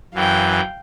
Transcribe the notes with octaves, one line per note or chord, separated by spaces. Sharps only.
F#2 E3 F5 G5